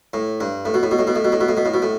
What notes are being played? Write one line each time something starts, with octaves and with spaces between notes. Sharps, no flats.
A2
G2
A2
B2
A2
B2
A2
B2
A2
B2
A2
B2
A2
B2
A2
B2
A2